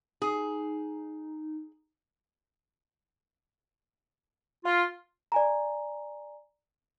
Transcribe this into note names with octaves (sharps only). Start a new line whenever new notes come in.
D#4 G#4
F4
D5 G#5 A#5